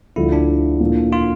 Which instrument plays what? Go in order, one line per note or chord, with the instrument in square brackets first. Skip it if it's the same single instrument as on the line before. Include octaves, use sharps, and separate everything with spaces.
[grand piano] D2 D3 F3 [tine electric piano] E4
[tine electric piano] D4
[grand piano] A#2 F3 A#3 E4
[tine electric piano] F4